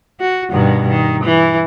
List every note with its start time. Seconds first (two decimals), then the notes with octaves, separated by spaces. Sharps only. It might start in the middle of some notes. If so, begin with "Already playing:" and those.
0.20 F#4
0.52 G2 B2 D#3
0.89 D#3
1.24 E3